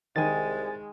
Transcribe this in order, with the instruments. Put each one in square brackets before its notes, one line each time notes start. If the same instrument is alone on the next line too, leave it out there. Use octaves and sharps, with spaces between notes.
[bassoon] C2 [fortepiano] D#3 [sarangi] G#3 [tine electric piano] G#5 A6